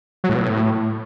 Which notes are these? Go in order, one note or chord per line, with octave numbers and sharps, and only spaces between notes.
F#3
A2
B2
A2